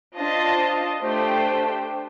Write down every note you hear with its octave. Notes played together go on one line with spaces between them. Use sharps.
D4 F4 C5 D#5 A5
A3 D4 G4 C5 G5